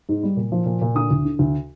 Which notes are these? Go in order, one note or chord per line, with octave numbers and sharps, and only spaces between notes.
G#2
G3
A#2
F3
A#2
A#2
D3 D#6
D2
D3
D2